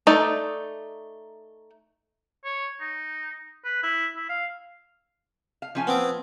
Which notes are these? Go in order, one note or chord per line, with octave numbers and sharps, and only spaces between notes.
A3 D#4 D5
C#5
D#4
B4
E4
E4
F5
F5
F3 C#4 G#5
B3 C4 D6